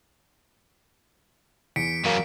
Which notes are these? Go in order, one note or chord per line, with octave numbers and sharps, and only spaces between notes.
E2 B6 C#7 D7
F#2 C#3 A#3